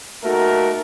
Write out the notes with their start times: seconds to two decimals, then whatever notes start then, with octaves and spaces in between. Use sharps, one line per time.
0.24 A3 A#3 D#4 F#4 A#4